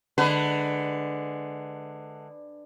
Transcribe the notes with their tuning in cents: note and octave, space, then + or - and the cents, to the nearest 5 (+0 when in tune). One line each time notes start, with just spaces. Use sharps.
D3 +15 G#3 +25 B4 +20